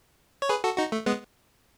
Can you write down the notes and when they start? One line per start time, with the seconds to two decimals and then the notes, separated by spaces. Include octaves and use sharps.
0.42 C#5
0.49 G#4 B4
0.64 F#4 A4
0.77 D#4 F#4
0.92 A3
1.06 G#3 B3